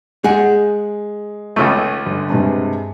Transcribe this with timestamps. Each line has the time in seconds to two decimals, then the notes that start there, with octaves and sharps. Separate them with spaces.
0.24 G#3 G#4 F#5
1.56 C#2 C#3 A3
2.06 G1
2.30 G2 C3 G#3